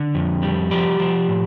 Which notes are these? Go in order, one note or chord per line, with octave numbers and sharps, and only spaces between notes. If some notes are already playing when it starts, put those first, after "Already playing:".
Already playing: D3
F2
G3
F3 G4
F3
A2